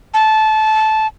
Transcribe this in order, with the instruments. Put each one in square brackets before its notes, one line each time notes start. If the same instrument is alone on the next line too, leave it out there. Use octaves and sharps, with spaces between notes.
[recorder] A5